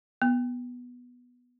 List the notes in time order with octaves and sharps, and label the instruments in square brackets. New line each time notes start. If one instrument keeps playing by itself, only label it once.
[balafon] B3